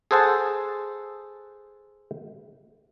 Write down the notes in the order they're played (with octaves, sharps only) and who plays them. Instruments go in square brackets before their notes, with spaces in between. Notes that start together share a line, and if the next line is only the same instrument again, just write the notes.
[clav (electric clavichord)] G#4 A4 C5 F#5 A5